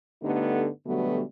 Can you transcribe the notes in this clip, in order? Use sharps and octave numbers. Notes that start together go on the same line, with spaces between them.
G2 D3 A3 B3 D#4 G4
B2 D3 F#3 G3 A3 B3